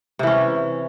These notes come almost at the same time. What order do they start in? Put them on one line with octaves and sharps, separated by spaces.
C3 E3 C#4